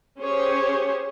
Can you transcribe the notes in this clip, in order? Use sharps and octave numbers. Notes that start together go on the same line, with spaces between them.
C#4 G4 G#4 C5 C#5